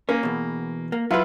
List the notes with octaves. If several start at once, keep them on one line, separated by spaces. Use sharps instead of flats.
A#3 C#4
E2 B2
A#3
F#3 E4 F4 B4